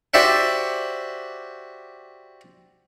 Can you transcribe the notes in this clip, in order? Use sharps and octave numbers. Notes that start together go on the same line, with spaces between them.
F#4 G4 C5 D5 E5 F#5